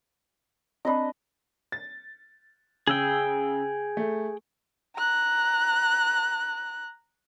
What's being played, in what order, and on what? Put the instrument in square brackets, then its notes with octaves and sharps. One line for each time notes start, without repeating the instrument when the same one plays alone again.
[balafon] C4 D5 [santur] D4 B4 D#5
[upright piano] A6
[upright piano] C#3 E6 [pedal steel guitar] G#4 G5
[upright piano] A3
[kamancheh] A#5 F#6